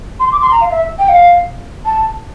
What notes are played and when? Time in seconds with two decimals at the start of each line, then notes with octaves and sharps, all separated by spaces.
0.19 C6
0.31 D6
0.41 C6
0.51 A#5
0.60 F5
0.70 E5
0.98 G5
1.08 F5
1.85 A5